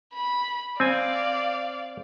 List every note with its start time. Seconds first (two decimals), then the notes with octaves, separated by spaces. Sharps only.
0.14 B5
0.80 C4 D5 F5 G#5